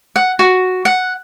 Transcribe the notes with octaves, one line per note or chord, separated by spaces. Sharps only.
F#5
F#4
F#5